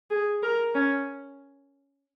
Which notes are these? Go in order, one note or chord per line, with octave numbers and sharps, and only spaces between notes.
G#4
A#4
C#4